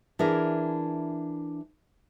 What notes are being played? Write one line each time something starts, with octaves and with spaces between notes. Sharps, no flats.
E3 D4 E4 G#4 A#4